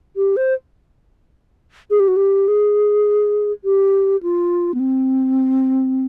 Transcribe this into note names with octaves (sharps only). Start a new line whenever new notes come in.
G4
C5
G#4
G4
F#4
G4
G#4
G4
F4
B3
C4